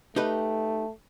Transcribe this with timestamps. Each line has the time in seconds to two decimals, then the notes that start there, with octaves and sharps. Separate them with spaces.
0.16 A3 D#4 G4 B4